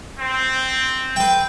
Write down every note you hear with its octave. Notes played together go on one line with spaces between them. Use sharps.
C4
B4 G5